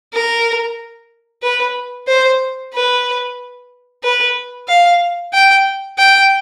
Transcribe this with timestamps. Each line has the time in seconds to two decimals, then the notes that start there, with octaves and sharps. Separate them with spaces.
0.13 A#4
1.43 B4
2.08 C5
2.74 B4
4.03 B4
4.68 F5
5.33 G5
5.98 G5